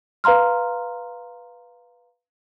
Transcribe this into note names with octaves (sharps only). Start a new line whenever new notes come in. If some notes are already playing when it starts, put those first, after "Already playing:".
B4 F5 A#5 C6 F6